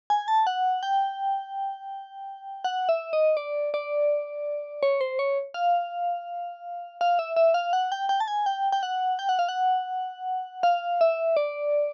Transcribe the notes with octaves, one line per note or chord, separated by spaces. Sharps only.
G#5
A5
F#5
G5
F#5
E5
D#5
D5
D5
C#5
C5
C#5
F5
F5
E5
E5
F5
F#5
G5
G5
A5
G#5
G5
G5
F#5
G5
F#5
F5
F#5
F5
E5
D5